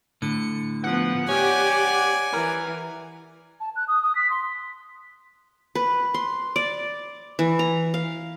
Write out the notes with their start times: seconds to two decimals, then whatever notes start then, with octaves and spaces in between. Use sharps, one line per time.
0.22 A2 D3 C#7
0.84 F3 B3 F#5
1.29 G4 C#5 D5 G5 G#5
2.33 E3 A#4
3.60 A5
3.76 F#6
3.88 D#6
4.03 D#6
4.15 B6
4.30 C6
5.75 B4
6.14 C6
6.56 D5
7.39 E3
7.59 A#5
7.94 F5